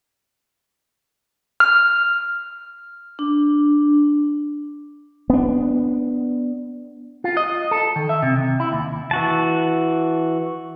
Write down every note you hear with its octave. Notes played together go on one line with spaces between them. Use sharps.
F6
D4
B3 D4
F4
D#5
A4
D#3
E5
C3
C3
E4
D#2
E3 F#4 A5